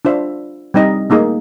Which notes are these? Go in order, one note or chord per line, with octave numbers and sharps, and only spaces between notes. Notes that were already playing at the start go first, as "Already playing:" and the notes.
D4 F4 C5 E5
G3 C4 D#4 D#5
A3 A#3 D#4 G#4